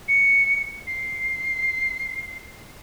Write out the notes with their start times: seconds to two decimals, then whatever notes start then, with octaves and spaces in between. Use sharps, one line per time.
0.08 C#7
0.86 C7